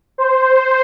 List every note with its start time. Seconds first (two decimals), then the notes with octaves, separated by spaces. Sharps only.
0.18 C5